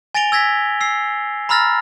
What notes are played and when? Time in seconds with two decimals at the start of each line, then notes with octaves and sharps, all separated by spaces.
0.15 G#5 A6 A#6 D7 F7 G7
0.32 E6 G#6 A#6 B6
0.81 E6 C7
1.49 A#5 B5 E6 F6 A6 A#6